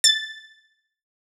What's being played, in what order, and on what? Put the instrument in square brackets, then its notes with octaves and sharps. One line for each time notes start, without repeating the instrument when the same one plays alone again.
[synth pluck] A6